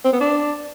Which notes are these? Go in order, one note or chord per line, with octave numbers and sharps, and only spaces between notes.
C4
B3
D4